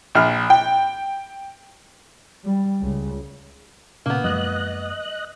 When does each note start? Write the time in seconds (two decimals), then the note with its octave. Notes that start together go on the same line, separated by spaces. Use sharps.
0.15 A#1 F6
0.50 G5
2.44 G3
2.82 C#2
4.06 A#2 C#3 A#3 B3
4.24 F#2 F3 G#3 D#5 F#6